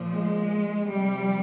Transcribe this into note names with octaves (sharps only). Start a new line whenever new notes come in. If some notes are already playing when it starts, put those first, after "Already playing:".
Already playing: A#2 F3
G#3
C3 F3 G3